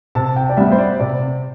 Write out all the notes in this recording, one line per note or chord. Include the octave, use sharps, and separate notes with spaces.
C3 A5
G5
D5
G3 B3 E5
C5
D5
C3 D5